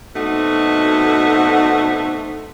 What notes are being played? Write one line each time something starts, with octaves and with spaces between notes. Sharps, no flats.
B2 A3 C4 D4 D#4 F#4